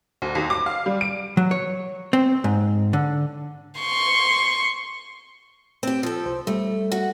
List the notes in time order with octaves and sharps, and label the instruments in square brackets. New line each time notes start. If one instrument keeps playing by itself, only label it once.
[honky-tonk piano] D2
D#2
D6
F5
G3
D7
[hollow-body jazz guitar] F#3
C#5
C4
G#2
D3
[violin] C6 C#6
[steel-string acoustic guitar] C4 G4
F3 A4
[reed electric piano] C2 C5
[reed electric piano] G3 [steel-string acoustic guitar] A3
[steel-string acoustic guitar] F#4 F#5